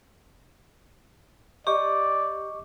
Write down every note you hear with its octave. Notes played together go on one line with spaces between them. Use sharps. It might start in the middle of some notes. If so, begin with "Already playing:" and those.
G4 D5 D#5 C#6 D6